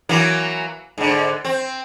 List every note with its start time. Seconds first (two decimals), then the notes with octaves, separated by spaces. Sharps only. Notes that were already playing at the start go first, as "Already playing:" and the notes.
0.09 E3 F#3 A#3
0.98 G#2 D3
1.45 C4